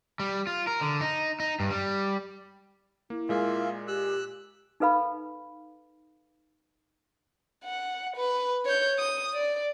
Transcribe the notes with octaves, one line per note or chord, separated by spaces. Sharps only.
G3
F4
A#4
D3
D#4
D#4
G2
G3
A#3 E4
A#2 G#3 A#3 F4 G#4 E5
G4 E6 F#6
D#4 A4 B4 F5 B5
F#5
B4
C#5 G6
D#6
D5